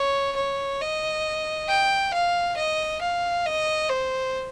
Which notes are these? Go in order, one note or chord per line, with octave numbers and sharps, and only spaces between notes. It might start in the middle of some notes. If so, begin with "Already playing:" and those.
Already playing: C#5
C#5
D#5
G5
F5
D#5
F5
D#5
C5